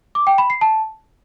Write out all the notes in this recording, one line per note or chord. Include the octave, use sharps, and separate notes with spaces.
D6
G5
B5
C7
A5